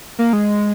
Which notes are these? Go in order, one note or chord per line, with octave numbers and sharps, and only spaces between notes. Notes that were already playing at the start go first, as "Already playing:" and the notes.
A#3
G#3